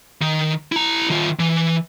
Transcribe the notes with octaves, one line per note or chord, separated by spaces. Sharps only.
D#3
E4 A#5
D#3 F4
E3